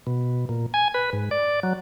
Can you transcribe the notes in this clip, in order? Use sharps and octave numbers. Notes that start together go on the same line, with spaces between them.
B2
A#2
G#5
B4
G#2
D5
F#3